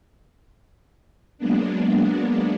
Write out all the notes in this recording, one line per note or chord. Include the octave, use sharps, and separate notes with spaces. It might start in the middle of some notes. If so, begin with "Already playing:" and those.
F#3 G#3 A#3 B3 D4